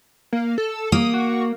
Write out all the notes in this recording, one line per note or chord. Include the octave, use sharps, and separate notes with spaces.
A#3
A4
A#3 D#6
F#4